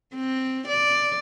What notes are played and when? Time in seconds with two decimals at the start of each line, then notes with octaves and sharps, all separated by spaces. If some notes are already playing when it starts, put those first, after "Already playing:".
0.15 C4
0.68 D5